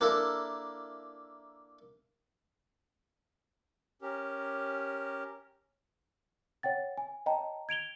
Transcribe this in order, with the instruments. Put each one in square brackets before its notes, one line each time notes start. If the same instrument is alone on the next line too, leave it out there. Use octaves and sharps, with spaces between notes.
[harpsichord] A#3 D4 E4 A4 A#4
[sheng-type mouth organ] C#4 G4 A#4
[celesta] C#5 F#5 G5 A6
G#5
C#5 D#5 G5 A5 A#5
G#6 D7 F7 G7